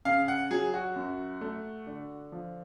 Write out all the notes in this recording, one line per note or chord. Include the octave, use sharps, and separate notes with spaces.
C#3 F5
F#5
F#3 G#4
F#4
F#2
A3
D3
F3